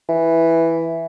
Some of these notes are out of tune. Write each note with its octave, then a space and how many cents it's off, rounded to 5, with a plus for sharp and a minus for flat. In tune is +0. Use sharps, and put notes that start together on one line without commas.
E3 +0